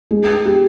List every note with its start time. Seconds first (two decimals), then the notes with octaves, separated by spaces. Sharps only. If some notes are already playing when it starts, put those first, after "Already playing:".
0.11 G#3
0.46 G4